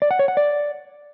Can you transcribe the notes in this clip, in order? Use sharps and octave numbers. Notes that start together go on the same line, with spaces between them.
D5
F#5
C#5
F#5
D5